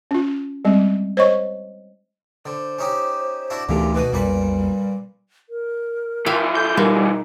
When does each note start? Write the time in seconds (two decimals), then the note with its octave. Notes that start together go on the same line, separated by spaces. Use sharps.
0.11 C#4 F4
0.65 G3 G#3 C4
1.17 C5 C#5 D#5 C#6
2.46 D3 C5
2.79 C#4 D#4 G4
3.50 D4 E4 F#4
3.69 D2 A#2 D3 E3 A3 G4
3.95 B2 F#4 B4
4.13 B1 F2 A#2 G3 B4
5.49 A#4
6.26 E3 F3 E5 F5 G5
6.55 A4 G6
6.77 B2 G3 G#3 A#3 D#4